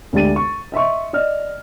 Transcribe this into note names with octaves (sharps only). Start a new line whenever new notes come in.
D2 G#3 D4 G4 A6 D#7
C#6
D#5 E5 C6 C#6
D5 D#5 F6